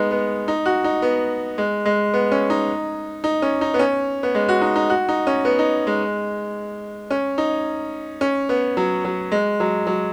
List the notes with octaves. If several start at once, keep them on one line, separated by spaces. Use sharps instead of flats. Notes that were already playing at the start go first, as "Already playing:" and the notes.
Already playing: G#3 B3 D#4
B3
D#4
F#4
D#4
B3
G#3
G#3
B3
C#4
D#4
D#4
C#4
D#4
B3
C#4
B3
G#3
F#4
D#4
D#4
F#4
D#4
C#4
B3
D#4
G#3
C#4
D#4
C#4
B3
F#3
F#3
G#3
F#3
F#3